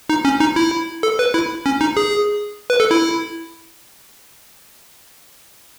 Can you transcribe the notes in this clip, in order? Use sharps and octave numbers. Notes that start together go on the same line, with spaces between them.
D#4
C#4
D#4
E4
A4
B4
E4
C#4
D#4
G#4
B4
A4
E4